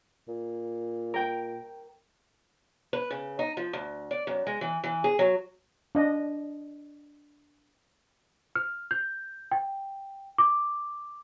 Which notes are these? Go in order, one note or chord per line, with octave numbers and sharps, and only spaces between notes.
A#2
A#4 G5
B4
C#3
D#4
F3
D2
D5
F#2
G#3
E3
E3
G#4
F#3
D4 D#5
F6
G6
G5
D6